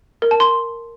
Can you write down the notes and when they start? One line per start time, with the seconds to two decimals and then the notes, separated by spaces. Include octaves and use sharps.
0.22 A#4
0.31 A5
0.40 C6